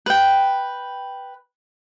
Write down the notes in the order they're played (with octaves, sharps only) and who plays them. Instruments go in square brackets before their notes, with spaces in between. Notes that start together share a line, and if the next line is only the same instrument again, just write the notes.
[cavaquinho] B4 G5